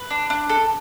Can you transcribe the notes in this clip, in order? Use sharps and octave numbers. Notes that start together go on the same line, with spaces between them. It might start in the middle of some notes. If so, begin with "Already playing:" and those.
Already playing: B4
D4
D4
A4